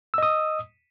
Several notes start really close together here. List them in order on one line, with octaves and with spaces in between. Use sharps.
E6 D#5 D#6